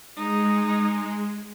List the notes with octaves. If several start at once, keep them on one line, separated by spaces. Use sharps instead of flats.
G#3 D#4